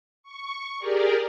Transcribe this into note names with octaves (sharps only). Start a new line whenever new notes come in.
C#6
G4 G#4 A#4 D5